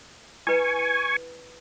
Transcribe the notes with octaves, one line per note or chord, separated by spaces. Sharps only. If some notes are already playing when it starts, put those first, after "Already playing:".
E4 B4 G#5 C#6